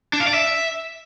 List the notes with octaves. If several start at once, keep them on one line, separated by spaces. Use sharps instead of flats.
D4
F5
D5
E5